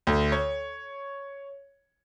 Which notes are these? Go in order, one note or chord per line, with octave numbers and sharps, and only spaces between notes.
D2
C#5